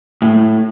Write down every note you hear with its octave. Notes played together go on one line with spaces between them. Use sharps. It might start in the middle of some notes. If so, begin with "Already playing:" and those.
A2